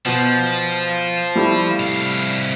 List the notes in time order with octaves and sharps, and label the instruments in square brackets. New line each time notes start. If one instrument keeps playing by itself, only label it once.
[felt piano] B2 [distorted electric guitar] F3
[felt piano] G3 A3 E4
[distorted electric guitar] C2 F5